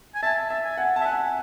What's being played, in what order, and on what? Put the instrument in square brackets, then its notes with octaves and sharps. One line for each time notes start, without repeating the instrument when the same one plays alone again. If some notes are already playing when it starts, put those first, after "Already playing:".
[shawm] G#5
[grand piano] E5 [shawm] A5
[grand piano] E5
[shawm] G#5
[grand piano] F#5
[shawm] E5 [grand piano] A5
[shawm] F#5 [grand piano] G#5